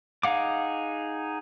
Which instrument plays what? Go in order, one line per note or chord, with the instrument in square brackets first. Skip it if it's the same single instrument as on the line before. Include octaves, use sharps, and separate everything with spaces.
[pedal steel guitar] D#4 G#4 F5 F#5 D6